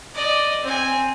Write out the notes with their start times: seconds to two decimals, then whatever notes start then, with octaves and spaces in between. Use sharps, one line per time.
0.14 D5 D#5
0.63 C4 G#5